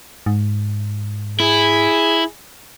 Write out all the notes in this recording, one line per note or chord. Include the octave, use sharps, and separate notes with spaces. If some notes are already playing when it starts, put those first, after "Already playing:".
G#2
E4 G#4